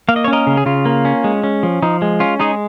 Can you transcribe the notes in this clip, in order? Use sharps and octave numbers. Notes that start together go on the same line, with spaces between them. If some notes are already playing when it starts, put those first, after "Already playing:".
A#3 F5
D#5
C#5
C#4
A#4 D#5
C#3
G#4
C#3 F4
A#3
C#4
G#3
C#4
F3
F3 D#4
G#3
C#4 F4
G#3 D#4 G#4